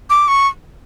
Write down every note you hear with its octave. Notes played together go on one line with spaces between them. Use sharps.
D6
C#6